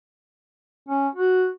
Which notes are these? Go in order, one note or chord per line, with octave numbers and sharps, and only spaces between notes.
C#4
F#4